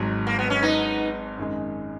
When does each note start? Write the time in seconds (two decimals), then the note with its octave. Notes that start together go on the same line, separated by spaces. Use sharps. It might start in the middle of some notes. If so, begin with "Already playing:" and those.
Already playing: G#1 G#2 F#3
0.27 A#3
0.39 B3
0.50 C#4
0.63 B3 D#4
1.38 F#2 D#3 G#3